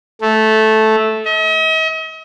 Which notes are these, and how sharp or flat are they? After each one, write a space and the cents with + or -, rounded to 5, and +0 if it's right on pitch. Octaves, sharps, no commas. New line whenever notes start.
A3 -10
D#5 +45